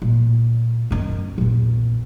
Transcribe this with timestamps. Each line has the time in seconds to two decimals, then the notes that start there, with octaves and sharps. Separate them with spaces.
0.02 A#2
0.91 F#1 D#3
1.38 A#1 E2